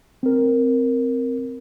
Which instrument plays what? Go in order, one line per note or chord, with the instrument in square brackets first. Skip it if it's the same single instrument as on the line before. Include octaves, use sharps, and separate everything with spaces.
[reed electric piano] C4 A#4